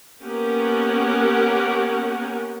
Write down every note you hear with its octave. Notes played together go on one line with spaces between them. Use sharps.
A#3 B3 C#4 G4 A#4 F#5